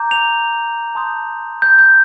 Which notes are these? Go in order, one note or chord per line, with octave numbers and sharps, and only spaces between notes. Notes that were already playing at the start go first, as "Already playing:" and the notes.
Already playing: A#5 D6 G6
F7
A5 C6 D#6 G6
G6
G6